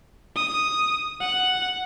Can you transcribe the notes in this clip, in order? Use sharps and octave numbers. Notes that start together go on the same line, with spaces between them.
D#6
F#5